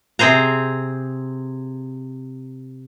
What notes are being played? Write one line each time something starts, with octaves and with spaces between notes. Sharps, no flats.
C3 C4 G#4 C5 A#5